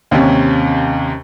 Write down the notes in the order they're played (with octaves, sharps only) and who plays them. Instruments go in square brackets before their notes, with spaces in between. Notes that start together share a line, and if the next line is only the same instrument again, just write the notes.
[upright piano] D#2 C3 C#4